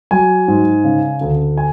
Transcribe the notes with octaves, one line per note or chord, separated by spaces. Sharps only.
F#3 G#5
G#2
C#3
D2
G#5